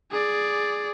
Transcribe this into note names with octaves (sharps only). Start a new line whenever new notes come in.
G#4 D5